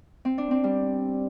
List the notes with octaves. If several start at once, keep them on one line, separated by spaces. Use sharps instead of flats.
C4
D4
C4
G3